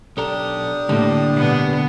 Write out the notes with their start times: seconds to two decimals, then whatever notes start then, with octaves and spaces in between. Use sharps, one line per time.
0.17 B1 D4 G4 A4 A#5 D#6
0.89 A2 D3 G3 A#3
1.34 B2 B3